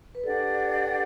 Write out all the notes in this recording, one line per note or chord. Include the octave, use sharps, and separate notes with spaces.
B4
D4 G4 A4 D5 F#5